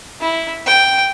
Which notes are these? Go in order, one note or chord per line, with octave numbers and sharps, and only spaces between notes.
E4
G5